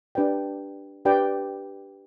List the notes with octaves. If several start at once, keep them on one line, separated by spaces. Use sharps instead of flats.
D4 G4 B4 D5 G5
D4 G4 B4 D5 G5